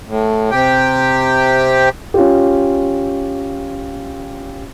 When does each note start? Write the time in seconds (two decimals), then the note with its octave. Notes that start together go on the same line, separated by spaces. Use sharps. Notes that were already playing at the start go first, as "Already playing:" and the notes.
0.08 A2
0.51 C3 G4 G5
2.14 C#4 F4 G4